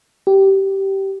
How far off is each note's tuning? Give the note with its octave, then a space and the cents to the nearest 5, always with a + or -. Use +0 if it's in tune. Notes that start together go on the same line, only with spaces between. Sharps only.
G4 -15